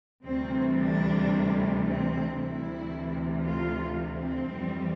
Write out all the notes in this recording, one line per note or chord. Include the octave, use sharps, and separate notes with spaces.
D2 C3 E3 G3 C4
D4
C4
D2 C3 E3 E4
F4
C4
F2 E3 G3